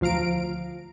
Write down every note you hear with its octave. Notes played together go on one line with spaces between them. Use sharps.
D2 F3 F5 A#5 D7